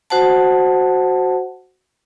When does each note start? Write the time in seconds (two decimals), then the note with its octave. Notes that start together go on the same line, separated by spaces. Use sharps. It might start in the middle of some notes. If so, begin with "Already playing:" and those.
0.10 F#4 C5 F#5 A5